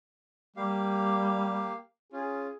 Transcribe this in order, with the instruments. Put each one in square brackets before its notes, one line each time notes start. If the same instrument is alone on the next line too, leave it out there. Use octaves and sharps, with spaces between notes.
[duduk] G3 [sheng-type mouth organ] A#3 G4 F5
[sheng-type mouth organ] C#4 F4 [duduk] G#4